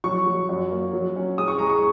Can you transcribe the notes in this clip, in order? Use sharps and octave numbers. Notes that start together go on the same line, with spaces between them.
F#3 C#6
F#3
F#2
A#3
F#3
C#4
G#3 D#6
C#6
G#3 A#5
C#6